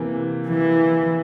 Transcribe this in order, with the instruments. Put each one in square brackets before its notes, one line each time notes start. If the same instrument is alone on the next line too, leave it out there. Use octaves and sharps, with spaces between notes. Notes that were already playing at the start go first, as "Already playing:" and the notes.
Already playing: [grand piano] C3 E3 A#3
[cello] E3